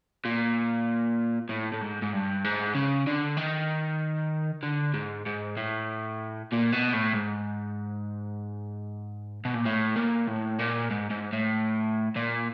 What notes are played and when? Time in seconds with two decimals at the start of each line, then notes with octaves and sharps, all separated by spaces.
0.25 A#2
1.49 A2
1.72 A2
1.81 G#2
2.02 G#2
2.13 G2
2.44 G#2
2.75 C#3
3.07 D3
3.37 D#3
4.63 D3
4.94 G#2
5.26 G#2
5.57 A2
6.52 A#2
6.72 B2
6.93 A2
7.13 G#2
9.45 B2
9.54 A#2
9.65 A2
9.96 A#2
10.28 A2
10.59 A#2
10.91 G#2
11.11 G#2
11.33 A2
12.16 A#2